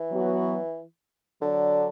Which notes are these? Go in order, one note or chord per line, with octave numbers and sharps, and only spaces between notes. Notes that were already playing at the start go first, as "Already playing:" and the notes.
Already playing: E3
F#3 B3 F#4
D3 F#3 D4 A4 D5